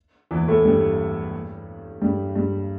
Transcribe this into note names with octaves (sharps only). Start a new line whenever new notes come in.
E2 E3
A2 A3
G2 G3
G2 G3
G2 G3